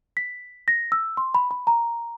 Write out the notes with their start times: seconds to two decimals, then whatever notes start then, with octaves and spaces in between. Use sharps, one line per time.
0.17 B6
0.68 A#6
0.92 E6
1.17 C6
1.35 B5
1.51 B5
1.67 A#5